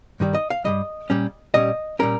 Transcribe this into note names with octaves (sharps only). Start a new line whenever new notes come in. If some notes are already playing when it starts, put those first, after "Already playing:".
G2 D#3 G3
D#5
F5
G2 D#3 G3 D#5
A#2 G3 C#4
A#2 G3 C#4 D#5
A#2 G3 C#4 A#4